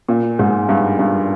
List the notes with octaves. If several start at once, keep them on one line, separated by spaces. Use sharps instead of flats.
A#2
G#2
G2
G2